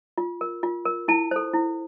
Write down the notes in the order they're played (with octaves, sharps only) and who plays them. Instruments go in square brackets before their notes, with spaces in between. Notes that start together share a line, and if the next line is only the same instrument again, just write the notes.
[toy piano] F4
A#4
F4
A#4
E4 A5
A4 C5
E4